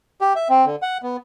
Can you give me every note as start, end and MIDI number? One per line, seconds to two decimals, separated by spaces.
0.21 0.33 67
0.36 0.48 76
0.49 0.65 60
0.66 0.76 50
0.82 0.98 78
1.03 1.17 59